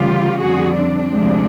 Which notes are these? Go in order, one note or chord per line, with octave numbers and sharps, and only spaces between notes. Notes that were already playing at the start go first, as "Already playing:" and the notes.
Already playing: D2 C#3 E3 G3 F4 G4
F2 D3 G3 F#4 G#4
C4 D4
D2 C3 F3 G#3